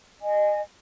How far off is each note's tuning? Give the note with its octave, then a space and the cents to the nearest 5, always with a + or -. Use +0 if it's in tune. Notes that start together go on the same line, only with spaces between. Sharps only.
D#5 -25 G#5 +0